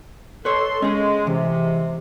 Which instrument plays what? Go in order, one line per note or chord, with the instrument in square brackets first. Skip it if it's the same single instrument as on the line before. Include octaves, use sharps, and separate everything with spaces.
[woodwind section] A4 C6 [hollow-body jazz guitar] B4 C#5
[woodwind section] G#3 [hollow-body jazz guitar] C#4 G#4
[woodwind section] C3 [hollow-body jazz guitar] E3